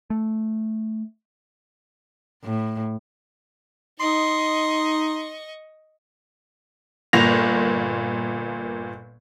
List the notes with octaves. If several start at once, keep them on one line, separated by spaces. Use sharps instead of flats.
A3
A2
D#4 D#5 C6 C#6
G1 A#2 A#3 A#6 F7